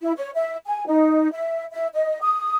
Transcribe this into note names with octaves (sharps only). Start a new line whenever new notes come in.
E4
C#5
E5
G#5
D#4
E5
E5
D#5
D#6